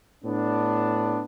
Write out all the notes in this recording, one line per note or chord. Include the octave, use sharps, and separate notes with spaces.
A2 B3 D4